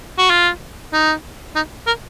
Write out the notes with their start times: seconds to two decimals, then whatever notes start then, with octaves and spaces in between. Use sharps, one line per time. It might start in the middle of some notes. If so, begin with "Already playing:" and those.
0.18 F#4
0.30 F4
0.93 D#4
1.56 D#4
1.87 A#4